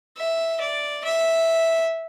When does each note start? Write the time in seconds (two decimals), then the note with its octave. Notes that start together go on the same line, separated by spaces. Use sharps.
0.17 E5
0.60 D5
1.04 E5